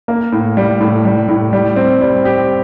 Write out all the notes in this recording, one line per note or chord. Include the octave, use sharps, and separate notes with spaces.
A#3
A2
G3
A2
G3
A2
G3
C4
G3
G4